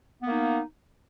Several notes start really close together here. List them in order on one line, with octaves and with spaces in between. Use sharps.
B3 A#3 D#4